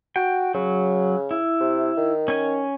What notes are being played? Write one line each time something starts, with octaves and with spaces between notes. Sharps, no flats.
F#4 G5
C#3 F#3
E4
C3
D#3
C#4 G#5